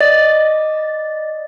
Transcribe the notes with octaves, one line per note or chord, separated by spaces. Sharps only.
D5 D#5 A6